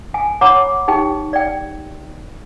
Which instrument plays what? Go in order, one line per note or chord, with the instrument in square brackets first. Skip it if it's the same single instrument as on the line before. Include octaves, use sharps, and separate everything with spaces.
[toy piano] G#5
C#5 F#5 A#5 B5 D6
D#4 G4 G5
D5 G5